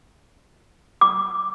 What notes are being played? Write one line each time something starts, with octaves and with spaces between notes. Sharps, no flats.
D6